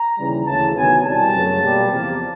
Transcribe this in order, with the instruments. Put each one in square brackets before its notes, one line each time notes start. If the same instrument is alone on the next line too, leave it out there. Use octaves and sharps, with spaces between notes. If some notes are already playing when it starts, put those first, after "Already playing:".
Already playing: [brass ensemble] A#5
D#2 C#3 E3 G3
D2 C#3 E3 A5
C3 D#3 F#3 B3 G#5
C2 B2 G3 A5
F#2 C#3 F#3 A3
B2 G3 A#3
E2 C3 F3 A#3